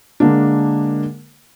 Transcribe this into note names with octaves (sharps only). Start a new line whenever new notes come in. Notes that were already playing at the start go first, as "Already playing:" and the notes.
D3 G#3 A#3 D4